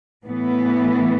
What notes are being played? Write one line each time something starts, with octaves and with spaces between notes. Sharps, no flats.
A2 E3 B3